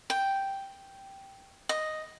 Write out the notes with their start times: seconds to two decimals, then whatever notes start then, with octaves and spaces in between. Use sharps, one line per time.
0.10 G5
1.69 D#5